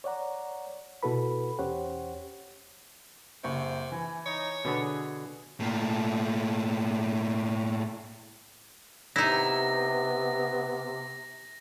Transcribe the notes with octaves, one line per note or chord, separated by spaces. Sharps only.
C#5 D5 F#5 A#5
B2 E4 F#4 A4 B4 B5
E2 C#4 G4 C5 C#5 F#5
F#1 C3 C#6
E3 G#5
D#4 C#5
B2 D3 B3 G#4
A2 A#3
C3 B3 D#4 E4 A#6